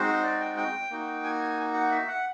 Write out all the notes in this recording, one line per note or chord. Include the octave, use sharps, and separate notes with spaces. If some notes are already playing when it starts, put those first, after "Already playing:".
Already playing: G#3 C4 D#4 F#4 C5
D5
G5
G5
A#3 D#4 F#4
G#5
F#5
E5
F#5